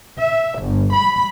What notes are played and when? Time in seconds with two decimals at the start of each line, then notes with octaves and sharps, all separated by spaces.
0.21 E5
0.61 G1
0.95 B5